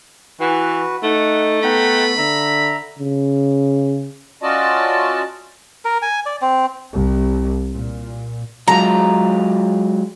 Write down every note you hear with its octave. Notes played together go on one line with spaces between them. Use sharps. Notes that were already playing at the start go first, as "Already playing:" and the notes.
E3 F#4 B4
A3 D#4 F#5
B3 F#5 G5 A#5 B5
D3 E5 A#5
C#3
C#4 F4 F#4 D5 D#5 A5
A#4
G#5
D5
C4
C2
A#2
F#3 G#3 F4 A#5